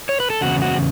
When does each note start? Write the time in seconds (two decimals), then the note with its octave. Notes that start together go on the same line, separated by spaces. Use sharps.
0.09 C#5
0.20 B4
0.30 A4
0.41 E2 C#3 F#4
0.62 F#4